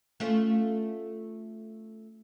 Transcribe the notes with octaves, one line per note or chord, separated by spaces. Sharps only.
A3 C#4 F4